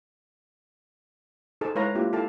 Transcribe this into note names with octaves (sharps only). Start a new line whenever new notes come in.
D#4 G#4 A4 C5 A5
G#3 E4 B4 C#5 F5 A#5
A#3 D4 E4 F4 G4
E4 A4 F5 G5 A5